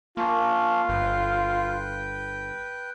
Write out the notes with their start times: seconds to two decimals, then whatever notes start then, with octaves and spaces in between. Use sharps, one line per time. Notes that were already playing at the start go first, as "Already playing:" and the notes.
0.17 A#3 C#4 D4 F4
0.89 G1 B4 G5